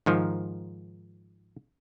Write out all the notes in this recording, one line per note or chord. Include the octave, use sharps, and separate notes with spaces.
G#2 D#3 F3